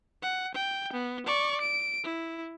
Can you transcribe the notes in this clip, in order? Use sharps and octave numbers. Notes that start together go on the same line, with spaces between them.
F#5
G5
B3
D5 C#6
D7
E4